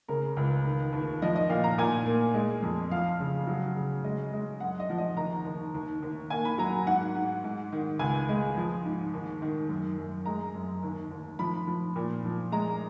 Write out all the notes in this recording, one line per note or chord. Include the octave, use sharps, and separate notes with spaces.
C#3 A#4
C#2
D#3
D#2
F3 D#5
D#5
A#2 F5
A#5
A#2 G#5
A#3
G#3
F2
F3 F5
C#3
F#3
C#3
G#3 D#5
G#3
F#2 F#5
D#5
F3
D#5
D#2 A#5
D#2
D#2
D#2
A#3 G#5
B5
F#3 A#5
G#2 F#5
G#2
G#2
D#3
C#2 G#5
G#3
F3
G#2
D#2
D#3
F#2
F#2
G#3 A#5
F#2
D#2
D#2
F3 B5
F3
A#2
F3
G#3 A#5